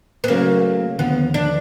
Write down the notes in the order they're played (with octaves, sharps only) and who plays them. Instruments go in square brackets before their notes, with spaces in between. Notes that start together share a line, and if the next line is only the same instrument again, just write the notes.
[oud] B3
[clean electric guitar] C#3 F#3 A3 C#4 [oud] A#3
[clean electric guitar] D#2 D3 F3 [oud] B3
[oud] D4